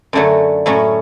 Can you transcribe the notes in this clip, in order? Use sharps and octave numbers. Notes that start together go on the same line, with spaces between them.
F#2 D3 F#3 A3
A2 F#3 A3 C#4